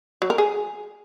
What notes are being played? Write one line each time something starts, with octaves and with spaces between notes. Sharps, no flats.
F#3
A#4
G#4